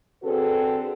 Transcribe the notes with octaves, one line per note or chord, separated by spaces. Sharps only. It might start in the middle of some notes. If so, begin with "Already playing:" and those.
D3 C4 F#4 G#4 A4 B4